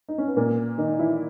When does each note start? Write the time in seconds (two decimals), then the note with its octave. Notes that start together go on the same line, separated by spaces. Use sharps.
0.09 D#4
0.18 C#4
0.28 B3
0.36 A#2 A#3
0.78 D#3 D#4
0.99 E3 E4